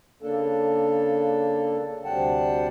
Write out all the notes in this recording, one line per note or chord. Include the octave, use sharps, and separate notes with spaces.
C#3 A#3 D4 A4
D2 C3 G3 F#5 G5 A5